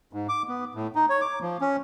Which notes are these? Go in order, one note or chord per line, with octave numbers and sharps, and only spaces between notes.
G#2
D6
B3
A2
D#4
C#5
D6
F3
C#4